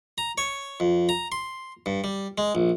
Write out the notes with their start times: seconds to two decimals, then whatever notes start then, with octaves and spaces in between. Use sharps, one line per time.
0.18 A#5
0.38 C#5
0.80 F2
1.09 A#5
1.32 C6
1.86 G2
2.04 G3
2.38 G#3
2.55 A#1